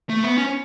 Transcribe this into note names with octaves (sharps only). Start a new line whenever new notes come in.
A3
B3
C#4